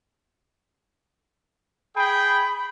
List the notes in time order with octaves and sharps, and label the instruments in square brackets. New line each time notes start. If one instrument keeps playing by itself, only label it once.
[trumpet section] G#4 G5 [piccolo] B5